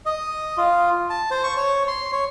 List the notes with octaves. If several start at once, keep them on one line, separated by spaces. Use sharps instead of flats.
D#5
F4
A5
C5
C#6
C#5
C6
C#5